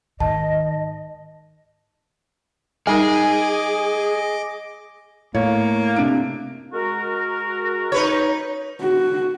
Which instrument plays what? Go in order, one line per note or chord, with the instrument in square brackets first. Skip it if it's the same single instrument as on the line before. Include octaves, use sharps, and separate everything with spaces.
[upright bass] G#2 D#3 [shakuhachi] D#5 [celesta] A5
[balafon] G3 D#4 A#4 [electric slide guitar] G#4 [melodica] D#5 D6 [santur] G#5
[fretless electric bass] A2 [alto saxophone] A#3 [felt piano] C#5
[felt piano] C3 D4 D7
[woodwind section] G#3 F#4 A#4
[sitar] D#4 B4 C#5
[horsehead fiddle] F#4